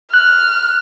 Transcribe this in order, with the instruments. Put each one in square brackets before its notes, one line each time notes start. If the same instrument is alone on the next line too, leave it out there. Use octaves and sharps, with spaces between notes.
[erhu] F6 [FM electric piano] F#6